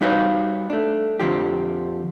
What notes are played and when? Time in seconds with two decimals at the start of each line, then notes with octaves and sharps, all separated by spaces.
0.01 G3 D#4 F#4 B4 C#5 F5
0.70 A3 D4
1.20 F2 G#2 D3 F3 G4